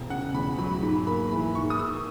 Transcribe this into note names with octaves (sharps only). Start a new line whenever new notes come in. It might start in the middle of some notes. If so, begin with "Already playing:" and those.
Already playing: E1
C#3 F#5
E2 B5
F#3 B5
G#2 B5
A#3 B5
E3 B5
G#2 C#6
D#6
G#2 E6